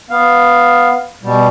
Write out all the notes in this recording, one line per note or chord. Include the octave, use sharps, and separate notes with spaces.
B3 F5
B2 G3